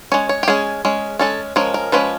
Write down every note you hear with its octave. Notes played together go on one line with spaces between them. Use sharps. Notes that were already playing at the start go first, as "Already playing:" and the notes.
G#3 C#4 C#5
C#5
G4
G#3 C#4 G#4
G#3 C#4
G#3 C#4 A4
F3 G#3 C#4 A#4
A#4
F3 G#3 C#4 B4